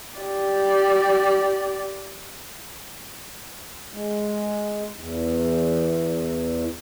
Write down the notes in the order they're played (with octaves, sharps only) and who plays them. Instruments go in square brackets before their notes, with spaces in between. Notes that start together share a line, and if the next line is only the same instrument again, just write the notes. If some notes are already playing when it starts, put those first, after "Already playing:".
[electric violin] G4 D5
[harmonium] G#3
E2